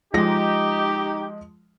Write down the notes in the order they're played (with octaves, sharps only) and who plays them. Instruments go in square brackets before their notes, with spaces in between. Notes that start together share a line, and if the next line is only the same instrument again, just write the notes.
[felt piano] F3 G#3 A#6 [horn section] D#4 G4